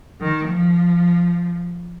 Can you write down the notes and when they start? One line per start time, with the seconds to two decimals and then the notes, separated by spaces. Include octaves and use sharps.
0.21 D#3
0.49 F3